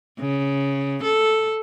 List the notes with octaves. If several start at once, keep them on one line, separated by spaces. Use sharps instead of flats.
C#3
A4